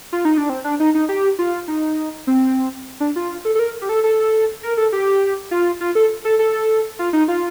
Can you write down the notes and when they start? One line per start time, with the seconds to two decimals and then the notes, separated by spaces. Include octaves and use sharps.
0.13 F4
0.25 D#4
0.38 D4
0.49 C4
0.64 D4
0.80 D#4
0.95 D#4
1.09 G4
1.39 F4
1.68 D#4
2.27 C4
3.00 D4
3.16 F4
3.45 A4
3.55 A4
3.59 A#4
3.81 G4
3.89 A4
4.04 A4
4.63 A#4
4.77 A4
4.92 G4
5.51 F4
5.81 F4
5.95 A4
6.25 A4
6.39 A4
6.99 F4
7.13 D#4
7.28 F4